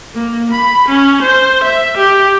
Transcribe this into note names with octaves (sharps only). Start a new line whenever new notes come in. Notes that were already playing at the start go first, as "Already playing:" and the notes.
A#3
B5
C#4
C5
E5
G4